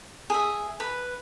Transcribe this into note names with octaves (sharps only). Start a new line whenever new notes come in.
G#4 E5
B4 B5